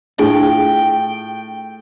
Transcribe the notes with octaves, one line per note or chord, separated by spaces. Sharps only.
A2 D4 F4 G#4 G5